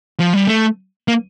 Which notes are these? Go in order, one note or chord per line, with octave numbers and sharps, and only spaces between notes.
F3
G3
A3
A#3